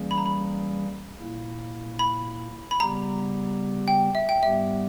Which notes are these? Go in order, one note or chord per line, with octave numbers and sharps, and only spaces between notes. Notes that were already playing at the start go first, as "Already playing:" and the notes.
Already playing: E3 G3 A#3 C#4 G#4
B5
A#5
B5
A#2 A#3 E4
B5
B5
C#3 G3 B3 G4 A#5
G5
E5
G5
G#2 G3 B3 G4 E5